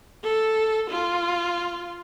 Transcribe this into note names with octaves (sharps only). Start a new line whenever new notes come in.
A4
F4